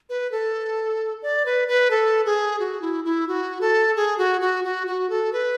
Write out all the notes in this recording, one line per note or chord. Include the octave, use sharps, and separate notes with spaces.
B4
A4
D5
B4
B4
A4
G#4
F#4
E4
E4
F#4
A4
G#4
F#4
F#4
F#4
F#4
A4
B4